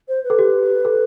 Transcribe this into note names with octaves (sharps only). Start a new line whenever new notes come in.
C5
B4
A4
G4
A4